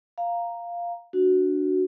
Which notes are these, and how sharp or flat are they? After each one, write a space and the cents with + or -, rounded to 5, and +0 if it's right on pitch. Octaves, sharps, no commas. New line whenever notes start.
F5 -5 A#5 +0
D4 +0 F#4 +0